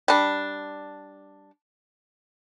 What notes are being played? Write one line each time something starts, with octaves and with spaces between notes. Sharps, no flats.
G3 D4